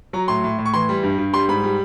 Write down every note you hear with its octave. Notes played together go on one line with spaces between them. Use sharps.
F#3 A#5
A2 C6
A2
A2
C#6
E3 C6
G3
G2
G2
G3 C6
G#2 B5
G3